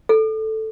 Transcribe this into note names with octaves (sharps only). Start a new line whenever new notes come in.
A4